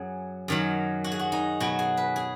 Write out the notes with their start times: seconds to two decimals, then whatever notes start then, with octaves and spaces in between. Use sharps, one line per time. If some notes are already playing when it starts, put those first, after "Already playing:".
Already playing: F#2 F#3 G#4
0.48 F#2 D#3 F#3
1.04 F#4
1.12 G#4
1.19 F#4
1.32 D#4
1.60 B2 F#3 F#4
1.79 G#4
1.97 B4
2.16 G#4